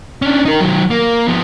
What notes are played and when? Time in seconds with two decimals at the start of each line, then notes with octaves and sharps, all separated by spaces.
0.22 C#4 D4
0.45 D#4 A#4
0.60 D#3 F#3
0.90 A#3
1.28 F3 B3